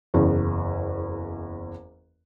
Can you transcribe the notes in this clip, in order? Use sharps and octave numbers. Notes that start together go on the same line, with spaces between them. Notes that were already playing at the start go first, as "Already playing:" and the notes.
F#1 E2